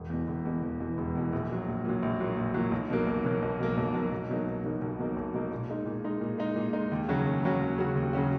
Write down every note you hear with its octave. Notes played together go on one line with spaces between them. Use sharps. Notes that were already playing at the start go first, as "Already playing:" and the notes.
Already playing: E1
E2 B2
E1
E2 B2
E1
E2 B2
E1
E2 B2
A#1
A#2 F#3
A#1
A#2 F#3
A#1
A#2 F#3
A#1
A#2 F#3
B1
B2 F#3 A#3
B1
B2 F#3 A#3
B1
B2 F#3 A#3
B1
B2 F#3 A#3
B1
B2 F#3 A#3 D#4
B1
B2 F#3 A#3 D#4
B1
B2 F#3 A#3 D#4
B1
B2 F#3 A#3 D#4
A#2
G#3 D#4
A#2
G#3 D#4
A#2
G#3 D#4
A#2
G#3 D#4
D#2
C#3 F#3 C#4 F#4
D#2
C#3 F#3 C#4 F#4
D#2
C#3 F#3 C#4 F#4
D#2
C#3 F#3 C#4 F#4